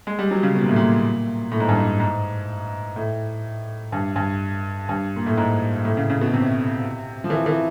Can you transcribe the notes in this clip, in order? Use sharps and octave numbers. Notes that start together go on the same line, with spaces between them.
G#3
G3
F#3
C#3
B2
A#2
A2
A#2
A2
G#2
G2
G#2
G#2
A2
G2
G2
G2
A#2
A2
G#2
A2
C#3
C#3
B2
C3
F3
E3
E3